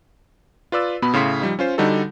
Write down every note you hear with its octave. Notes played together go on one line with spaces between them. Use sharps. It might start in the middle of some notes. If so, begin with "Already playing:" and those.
F4 B4 D5 E6
B2 B3 B5
A2 C#3 F5 C6 B6 C#7
F3 G3 D#4
C#4 F4 C5
D3 G3 D#4 F#4 A4